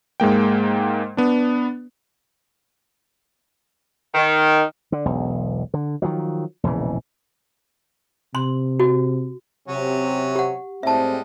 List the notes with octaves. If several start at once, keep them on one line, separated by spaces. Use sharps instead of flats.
G#2 G#3 A#3 G5
B3 D4
D#3
D3
E1 B1
D3
D#3 F3 F#3
E1 A#1 C#3 E3
C3 C6
F#4
C3 F#3 C#4
G4 F#5
A2 G3 G#3 C4 E5 A5